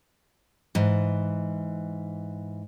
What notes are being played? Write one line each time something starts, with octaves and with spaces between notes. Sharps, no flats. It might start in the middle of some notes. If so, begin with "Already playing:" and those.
G#2 E3